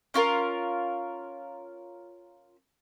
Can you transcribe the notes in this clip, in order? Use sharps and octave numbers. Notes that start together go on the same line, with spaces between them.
C#4 F4 A#4